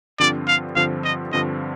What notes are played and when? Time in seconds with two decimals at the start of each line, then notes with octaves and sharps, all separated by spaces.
0.20 G2 D3 F3 C4 F4 D5
0.48 F5
0.75 G2 D3 F3 C4 F4 F5
1.04 D#5
1.32 G2 D3 F3 C4 F4 D#5